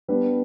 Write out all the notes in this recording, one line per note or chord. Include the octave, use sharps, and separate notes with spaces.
G3 B3 D4 B4